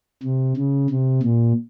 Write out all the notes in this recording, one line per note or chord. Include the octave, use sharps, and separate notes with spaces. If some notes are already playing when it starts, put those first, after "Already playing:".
C3
C#3
C3
A#2